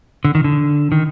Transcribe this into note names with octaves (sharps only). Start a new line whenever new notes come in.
D3
D#3
D3
D#3